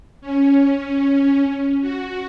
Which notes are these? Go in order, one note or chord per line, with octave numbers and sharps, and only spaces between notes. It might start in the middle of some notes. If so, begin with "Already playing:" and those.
C#4
F#4